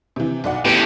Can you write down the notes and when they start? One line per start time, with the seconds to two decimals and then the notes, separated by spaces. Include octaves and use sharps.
0.16 C3 E3
0.44 B1 D5 F#5
0.65 A2 B3 G4